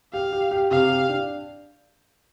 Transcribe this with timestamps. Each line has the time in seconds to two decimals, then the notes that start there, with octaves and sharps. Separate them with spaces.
0.13 G4 F5
0.33 G4
0.51 G4
0.71 C3 F5
0.90 G4
1.09 D4